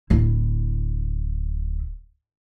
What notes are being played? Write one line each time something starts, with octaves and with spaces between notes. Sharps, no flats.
D1 E4